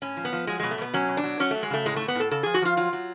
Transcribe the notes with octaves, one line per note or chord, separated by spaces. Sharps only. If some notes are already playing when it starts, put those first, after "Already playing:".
A2 C#4
F3
B3
F3
F#3 G#3
B2 G#3
A3
B2 B3
F#3 C#4
B2
D4
F#3
F#3 C#4
F#3 A3
G#3
C#3 A3
A2 G#3
A2 A3
B3
A2 A4
C#3 A4
F3 G#4
F#4
F3 F4
F#3 F4
F#3